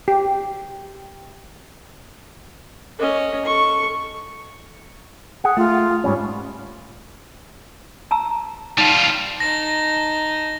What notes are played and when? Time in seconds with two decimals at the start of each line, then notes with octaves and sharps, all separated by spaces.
0.08 G4
2.98 C#4 D#5
3.46 A4 C#6
5.44 G#4 F#5
5.57 A3 F4
6.04 G#2 G3 C#4
8.11 A5 A#5 E6
8.78 G3 D#4 F4
9.40 D#4 A5 A#6